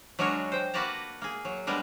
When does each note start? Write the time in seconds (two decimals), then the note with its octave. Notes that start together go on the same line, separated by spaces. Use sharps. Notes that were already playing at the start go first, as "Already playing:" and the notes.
0.19 F#3 G#3 D4 F#4 A#4 C#5
0.52 C5 G5
0.74 A#3 F#4 B4 D5 A5 A#5
1.22 A#3 G#4
1.45 F#3
1.67 G3 G#3 B3 D4 A#4